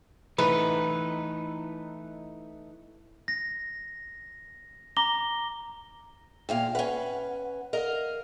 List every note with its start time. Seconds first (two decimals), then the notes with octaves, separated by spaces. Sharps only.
0.38 E3 A3 D#4 B4
3.28 A#6
4.97 A#5 D6 A#6 G7
6.49 E2 A#2 F5 G5
6.75 C#4 B4 F#5
7.73 A#4 D#5 F5